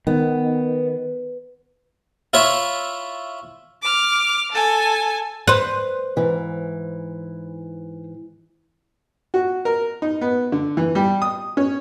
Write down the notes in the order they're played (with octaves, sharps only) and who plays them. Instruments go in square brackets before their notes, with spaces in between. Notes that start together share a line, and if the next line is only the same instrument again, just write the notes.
[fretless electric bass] D#3 [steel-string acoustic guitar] B3
[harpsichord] E4 F4 C#5 E5
[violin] D6 F6
A4 G#5
[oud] B4 C5
[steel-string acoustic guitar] G#2 E3
[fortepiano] F#4
A#4
D#4
B3
D3
E3
G3
D#6
C#4